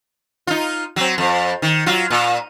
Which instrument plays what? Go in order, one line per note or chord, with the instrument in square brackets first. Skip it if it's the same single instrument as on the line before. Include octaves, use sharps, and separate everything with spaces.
[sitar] D#4 F4
F#3 C4
F2
D#3
F#3 F4
A#2